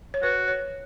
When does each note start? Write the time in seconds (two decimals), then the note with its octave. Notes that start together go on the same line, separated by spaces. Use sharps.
0.14 C#5
0.23 F#4 B4
0.48 C#5